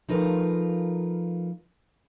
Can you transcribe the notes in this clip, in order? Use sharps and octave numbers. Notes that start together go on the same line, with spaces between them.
F3 A3 D#4 F4 A#4 B4